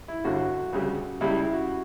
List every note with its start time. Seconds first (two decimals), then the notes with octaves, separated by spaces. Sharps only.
0.08 E4
0.24 G1 G2 D3 F#4
0.73 D2 C#3 G3
1.21 C#2 C#3 G3 E4
1.37 E4
1.53 F#4